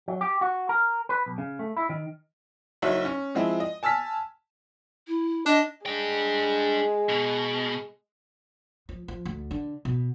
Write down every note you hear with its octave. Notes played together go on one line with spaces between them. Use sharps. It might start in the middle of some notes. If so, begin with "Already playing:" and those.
F#3
G4
F#4
A#4
B4
B1
C#3
A3
E4
D#3
F#1 D#4 F#4 C#5 E5
C#4
F3 G#3 C4 E4
D#5
G#5 A5 E6 F6 B6
E4
D4 D#5
G#3 D4 G5
B2
F3
F3
D2
D3
B2